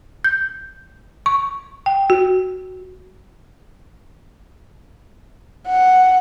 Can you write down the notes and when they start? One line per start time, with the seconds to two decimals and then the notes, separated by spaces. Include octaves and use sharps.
0.24 G6
1.26 C#6
1.86 G5
2.10 F#4
5.67 F#5